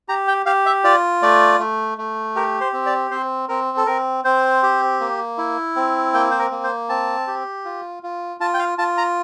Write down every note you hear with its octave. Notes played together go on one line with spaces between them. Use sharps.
G4 A#5
G5
G4 F5
E5
F4 D5
A3 D5
A3
A3
G4 A#4
C5
C4
D5
C4 C5
C4 A#4
A4
C4 A#4
C4 C5
G4
A#3
E4
C4
A#3 G5
C5
A#4
A#3
C5
C4 A5
G4
F4
F4
F4 A5
G5
F5
F4 A5
A#5